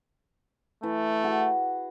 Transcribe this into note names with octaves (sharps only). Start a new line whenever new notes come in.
E3 A3
F#4 G#4